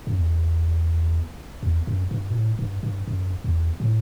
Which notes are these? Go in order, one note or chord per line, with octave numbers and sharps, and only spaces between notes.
F#2
E2
E2
F#2
G2
B2
A2
G2
G2
F#2
E2
A2